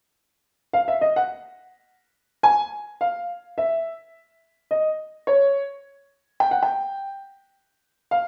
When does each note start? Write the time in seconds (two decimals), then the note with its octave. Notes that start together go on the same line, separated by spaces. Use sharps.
0.73 F5
0.88 E5
1.01 D#5
1.16 F#5
2.43 G#5
3.01 F5
3.58 E5
4.71 D#5
5.27 C#5
6.40 G5
6.51 F#5
6.63 G5
8.11 F5